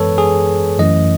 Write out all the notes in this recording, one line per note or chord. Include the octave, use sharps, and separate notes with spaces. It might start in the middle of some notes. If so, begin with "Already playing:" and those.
Already playing: F#2 E3 G#3 B3 A4 B4 C#5
G#4
F#2 E3 A3 C#4 D#5